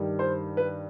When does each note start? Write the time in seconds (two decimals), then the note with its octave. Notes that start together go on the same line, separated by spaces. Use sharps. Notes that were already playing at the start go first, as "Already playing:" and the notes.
Already playing: G2 D#3 G3
0.19 C5
0.57 B4